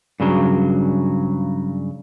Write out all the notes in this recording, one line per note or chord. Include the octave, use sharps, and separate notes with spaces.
G2 C#3 F#3